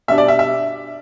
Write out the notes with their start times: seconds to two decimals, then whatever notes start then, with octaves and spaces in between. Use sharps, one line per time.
0.08 B2 G3 D4 E5
0.18 D5
0.28 E5
0.39 E5